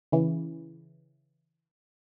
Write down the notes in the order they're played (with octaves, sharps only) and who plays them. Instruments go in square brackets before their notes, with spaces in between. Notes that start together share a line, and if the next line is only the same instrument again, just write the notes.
[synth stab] C#3 E3